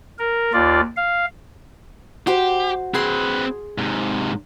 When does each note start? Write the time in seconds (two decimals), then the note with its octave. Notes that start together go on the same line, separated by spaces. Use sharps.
0.19 A#4
0.53 D#2 F4 D5
0.97 F5
2.27 F#4 G4 C5
2.94 C4 G#4 B4 C6
3.78 G#2 C3